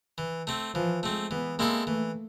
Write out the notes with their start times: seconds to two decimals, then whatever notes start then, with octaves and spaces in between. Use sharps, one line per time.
0.18 E3
0.47 A3 C4
0.74 E3 F3
1.03 G#3 A3 C4
1.30 E3 B3
1.58 G#3 A#3 C4 E4 A4
1.87 E3 A3